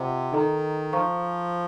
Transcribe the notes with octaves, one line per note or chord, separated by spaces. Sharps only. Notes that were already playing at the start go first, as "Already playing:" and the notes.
Already playing: C3 F4 C5 D#5 F#5
D#3 D#4 A4 D#5 A#5
F3 C5 F5 A#5 C#6